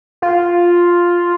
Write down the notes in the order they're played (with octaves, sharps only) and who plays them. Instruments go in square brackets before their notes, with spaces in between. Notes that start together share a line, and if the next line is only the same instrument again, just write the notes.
[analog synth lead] F4